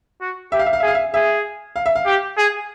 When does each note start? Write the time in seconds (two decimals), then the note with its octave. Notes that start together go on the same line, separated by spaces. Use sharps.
0.21 F#4
0.52 G4 E5
0.59 F5
0.66 E5
0.73 F5
0.80 E5
0.83 G#4
0.88 F5
0.95 E5
1.14 G#4 E5
1.76 F5
1.86 E5
1.95 F5
2.06 G4
2.37 G#4